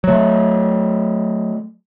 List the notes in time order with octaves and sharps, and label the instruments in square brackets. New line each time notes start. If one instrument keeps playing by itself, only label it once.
[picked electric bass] F#3 A3